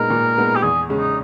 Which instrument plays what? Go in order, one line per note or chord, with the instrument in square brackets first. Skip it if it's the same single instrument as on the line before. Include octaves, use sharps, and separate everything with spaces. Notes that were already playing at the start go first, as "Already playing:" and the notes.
Already playing: [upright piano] A#2 G#3 B3 D#4 [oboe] A#4
[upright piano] A#2
G#3 B3 D#4
[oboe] G4
[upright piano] E2 [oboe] G#4
[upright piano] C#3 G#3 C#4
[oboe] D#4